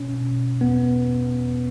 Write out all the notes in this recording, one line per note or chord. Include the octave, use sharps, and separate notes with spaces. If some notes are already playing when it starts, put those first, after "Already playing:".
Already playing: B2 C#4
B2
E2 B3
E2
E2